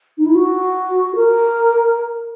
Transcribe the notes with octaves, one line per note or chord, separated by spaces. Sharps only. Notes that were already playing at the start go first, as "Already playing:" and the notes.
D#4
E4
F#4
A#4